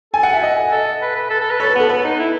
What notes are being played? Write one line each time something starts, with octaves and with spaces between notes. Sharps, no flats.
A4 G#5
F#5
E5
D#5
A4 D#5
B4
B4
A4
A4
B4
A4 C#5
B4
B3
A4
B3 B4
D#4
E4